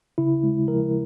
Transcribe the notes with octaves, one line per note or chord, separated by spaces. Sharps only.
C#3 E4
G#3
F3 A#4